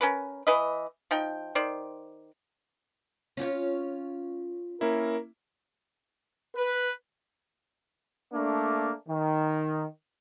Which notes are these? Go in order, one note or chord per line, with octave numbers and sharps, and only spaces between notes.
C#4 A#4 B4
E3 B4 D#5
F3 D#4 G5
D#3 C5 D5
C#4 F4 C#5
A#3 C#4 E4 A#4
B4
A3 A#3 D4
D#3